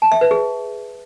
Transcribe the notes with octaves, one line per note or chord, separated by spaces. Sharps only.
A5
E5
B4
G#4